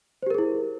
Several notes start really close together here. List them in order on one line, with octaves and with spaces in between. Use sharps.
C5 G4 A#4 G#4 E4